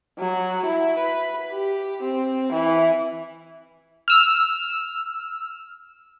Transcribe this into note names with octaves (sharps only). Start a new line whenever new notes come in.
F#3
E4
B4
G4
C4
E3
E6 F6